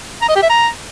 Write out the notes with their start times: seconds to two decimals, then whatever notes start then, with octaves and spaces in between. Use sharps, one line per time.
0.22 A#5
0.29 D#5
0.35 G4
0.42 E5
0.49 A#5